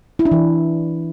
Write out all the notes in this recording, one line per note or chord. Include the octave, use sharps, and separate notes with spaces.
E4
D4
E3